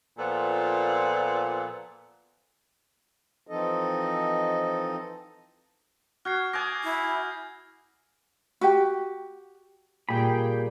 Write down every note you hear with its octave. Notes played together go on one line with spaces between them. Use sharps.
A#2 F3 B3 A4 D5
E3 F3 C4 D#4 A4 D#5
F#4 F6 G#6 C7
G#5 D6 D#6 G6 A#6
E4
F#4 G4 G5
A#2 G3 A#3 G#4 G5 B5